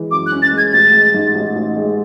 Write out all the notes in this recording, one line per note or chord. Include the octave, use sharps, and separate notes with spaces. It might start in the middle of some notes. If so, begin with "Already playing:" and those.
Already playing: E3 G#3
F#2 D6
F#6
C#4
A6
G#3
G#6
A1 A6
G#3
G#2
A1
A1
G#3